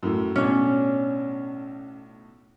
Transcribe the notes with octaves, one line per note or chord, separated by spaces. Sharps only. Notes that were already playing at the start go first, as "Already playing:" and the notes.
F#2 A2
B1 A2 C#4 D4